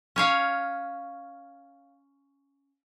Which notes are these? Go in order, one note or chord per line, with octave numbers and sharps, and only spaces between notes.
C#4 C#5 F5